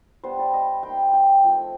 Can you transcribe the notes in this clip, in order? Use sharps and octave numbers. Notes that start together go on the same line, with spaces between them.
G3 B3 D4 C5
D5
D#5
G3 A#3 D#4 G5
G5
F3 A3 C4 G5